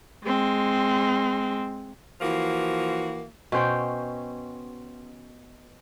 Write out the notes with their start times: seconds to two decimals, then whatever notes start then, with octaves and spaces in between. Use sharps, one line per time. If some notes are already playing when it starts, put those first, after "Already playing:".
0.25 G#3 C4
2.21 E3 F3 A#3 F#4
3.52 B2 C#4 C5 G5